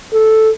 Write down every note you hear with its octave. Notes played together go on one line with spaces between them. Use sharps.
A4